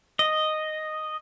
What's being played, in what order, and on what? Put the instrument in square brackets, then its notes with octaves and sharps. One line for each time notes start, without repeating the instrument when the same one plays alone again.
[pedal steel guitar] D#5